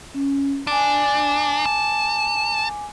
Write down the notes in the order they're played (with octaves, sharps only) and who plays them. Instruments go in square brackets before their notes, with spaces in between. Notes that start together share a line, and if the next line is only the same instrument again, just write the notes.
[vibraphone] C#4
[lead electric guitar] D4 [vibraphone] G#5 D6
[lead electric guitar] A5